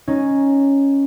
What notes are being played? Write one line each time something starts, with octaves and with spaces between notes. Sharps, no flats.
C#4 D#4